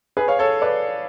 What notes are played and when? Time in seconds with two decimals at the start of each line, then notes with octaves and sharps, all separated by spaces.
0.17 G#4 B4
0.28 C#5 F5
0.39 A4 C#5
0.62 B4 D5